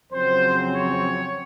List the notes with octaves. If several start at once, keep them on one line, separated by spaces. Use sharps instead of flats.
F2 C#3 F#3 C4 C5
C#5